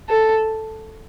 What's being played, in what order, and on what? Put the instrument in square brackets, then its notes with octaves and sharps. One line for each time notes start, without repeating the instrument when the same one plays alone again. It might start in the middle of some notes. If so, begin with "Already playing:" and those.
[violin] A4